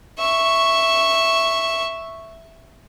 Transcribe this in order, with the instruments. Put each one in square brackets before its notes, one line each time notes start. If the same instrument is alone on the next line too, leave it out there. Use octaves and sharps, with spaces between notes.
[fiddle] E5 C#6